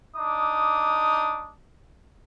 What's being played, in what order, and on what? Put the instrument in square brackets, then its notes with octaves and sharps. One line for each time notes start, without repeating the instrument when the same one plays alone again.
[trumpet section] D4 D#4 D6 D#6